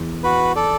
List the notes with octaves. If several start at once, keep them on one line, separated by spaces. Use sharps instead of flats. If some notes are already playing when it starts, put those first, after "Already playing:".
Already playing: E2
F#4 B4
A4 D5